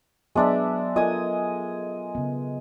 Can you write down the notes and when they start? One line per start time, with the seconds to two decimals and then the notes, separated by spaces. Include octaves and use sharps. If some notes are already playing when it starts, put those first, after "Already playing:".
0.35 F#3 G#3 B3 D4 D5 E5
0.96 F4 A4 A#4 D#5 G#5 D#6
2.15 C#3 B3